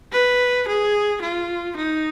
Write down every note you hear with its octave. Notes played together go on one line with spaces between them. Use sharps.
B4
G#4
F4
D#4